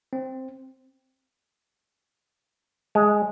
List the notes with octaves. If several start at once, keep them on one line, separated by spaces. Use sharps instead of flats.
C4
G#3